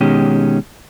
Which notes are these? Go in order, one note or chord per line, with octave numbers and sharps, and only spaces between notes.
B2 D#3 G#3 C#4 G4